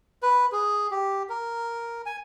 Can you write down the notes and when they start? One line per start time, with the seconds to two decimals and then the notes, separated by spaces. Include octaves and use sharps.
0.23 B4
0.52 G#4
0.91 G4
1.29 A#4
2.06 G#5